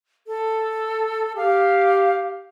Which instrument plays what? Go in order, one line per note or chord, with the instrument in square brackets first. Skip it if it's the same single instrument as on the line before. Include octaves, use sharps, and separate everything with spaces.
[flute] A4
[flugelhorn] G4 [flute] F5